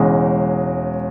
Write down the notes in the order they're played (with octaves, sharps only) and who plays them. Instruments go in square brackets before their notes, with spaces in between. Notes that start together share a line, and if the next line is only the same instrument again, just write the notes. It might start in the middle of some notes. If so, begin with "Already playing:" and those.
Already playing: [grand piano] E1 E2 C#3 G#3